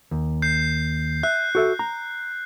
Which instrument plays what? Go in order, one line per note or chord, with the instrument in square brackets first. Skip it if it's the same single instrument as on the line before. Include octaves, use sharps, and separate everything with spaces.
[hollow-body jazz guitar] D#2
[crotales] G6 C7
[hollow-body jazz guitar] E5 [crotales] F#6
[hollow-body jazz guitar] F#4 A4 E5
A#5